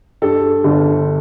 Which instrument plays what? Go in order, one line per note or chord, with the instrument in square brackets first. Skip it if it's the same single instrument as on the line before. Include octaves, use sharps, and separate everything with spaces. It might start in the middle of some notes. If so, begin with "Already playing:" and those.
[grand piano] G2 A4
G1